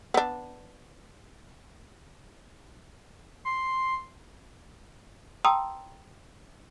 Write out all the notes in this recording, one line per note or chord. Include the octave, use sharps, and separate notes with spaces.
B3 D4
C6
G5 A5 A#5 C6 D#6 E6